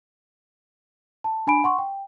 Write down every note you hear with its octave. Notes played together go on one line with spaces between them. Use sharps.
A5
D4 G#5 B5 D7
F#5 C6 C#6
G5